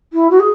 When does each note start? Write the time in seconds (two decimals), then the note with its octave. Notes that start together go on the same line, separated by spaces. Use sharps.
0.13 E4
0.30 F#4
0.39 G#4